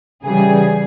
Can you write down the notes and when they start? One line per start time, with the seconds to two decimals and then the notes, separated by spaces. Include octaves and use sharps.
0.24 C#3 E3 G3 G#4